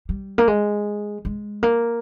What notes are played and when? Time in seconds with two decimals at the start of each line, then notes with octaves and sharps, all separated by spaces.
0.09 G3
0.38 A#3
0.48 G#3
1.25 G#3
1.63 A#3